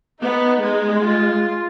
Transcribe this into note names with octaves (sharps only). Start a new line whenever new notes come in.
B3 D#4
G#3
F4